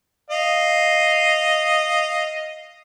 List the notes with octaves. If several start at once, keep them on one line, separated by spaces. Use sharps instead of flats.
D#5 F5